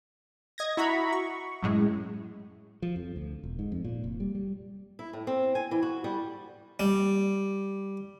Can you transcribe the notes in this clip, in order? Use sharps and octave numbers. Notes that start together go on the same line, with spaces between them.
D#5 G#6 A#6
E4 F#4 A#5 B5 C#6
C#6
F#2 A2 G#3
F3
F2
D2
E1
G#2
F2
A#2
F1
G3
G3
E4
A2
C4
G#5
E3
F#4
G3
G3